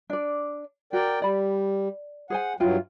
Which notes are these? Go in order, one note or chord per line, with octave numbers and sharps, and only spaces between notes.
D4 D5
F#4 A#4 D5 G5
G3 D5 B5
G#4 C5 F#5 G#5
G2 F#3 E4 F4 G5